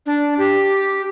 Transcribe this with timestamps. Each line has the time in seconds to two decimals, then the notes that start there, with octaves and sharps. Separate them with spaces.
0.06 D4
0.38 G4